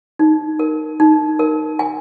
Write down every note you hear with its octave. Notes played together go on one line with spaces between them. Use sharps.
D#4
A#4
D#4
A#4
G#5